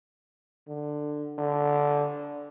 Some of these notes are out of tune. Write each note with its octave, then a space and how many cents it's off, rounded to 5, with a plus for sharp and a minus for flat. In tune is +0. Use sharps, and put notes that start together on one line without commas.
D3 +15
D3 -10